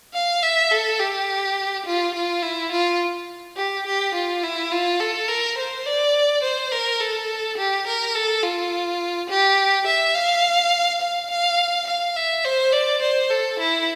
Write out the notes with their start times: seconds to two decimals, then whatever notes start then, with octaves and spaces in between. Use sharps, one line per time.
0.14 F5
0.43 E5
0.71 A4
1.00 G4
1.86 F4
2.14 F4
2.42 E4
2.72 F4
3.57 G4
3.86 G4
4.14 F4
4.43 E4
4.72 F4
5.00 A4
5.28 A#4
5.58 C5
5.86 D5
6.43 C5
6.72 A#4
7.00 A4
7.58 G4
7.87 A#4
8.15 A4
8.44 F4
9.30 G4
9.86 E5
10.15 F5
11.01 F5
11.30 F5
11.87 F5
12.16 E5
12.44 C5
12.73 D5
13.02 C5
13.30 A4
13.60 E4